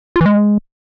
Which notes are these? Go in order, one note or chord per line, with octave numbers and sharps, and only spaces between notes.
F4
E3
G#3